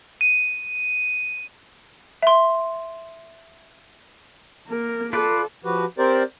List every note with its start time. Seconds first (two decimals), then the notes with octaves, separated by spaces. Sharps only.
0.21 D#7
2.22 E5 C6
4.67 A#3 A#4
5.13 F4 A4 B4 D5
5.65 F3 F#4 G4 B4
5.99 C4 G4 A#4 C5 D5